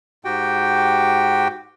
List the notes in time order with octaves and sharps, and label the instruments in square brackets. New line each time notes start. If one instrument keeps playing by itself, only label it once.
[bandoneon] G#2 F#4 G4 G5